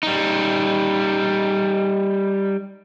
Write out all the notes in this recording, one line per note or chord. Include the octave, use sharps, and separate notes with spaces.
G3 D#4